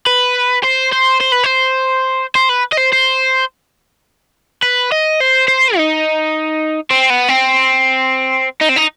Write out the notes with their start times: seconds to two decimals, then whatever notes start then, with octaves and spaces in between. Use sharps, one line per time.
0.07 B4
0.64 C5
0.93 C5
1.21 C5
1.32 B4
1.44 C5
2.35 C5
2.49 B4
2.72 D#5
2.77 C5
2.92 C5
4.63 B4
4.92 D#5
5.20 C5
5.48 C5
5.77 D#4
6.91 C4
7.10 B3
7.29 C4
8.61 D#4
8.69 C4
8.77 D#4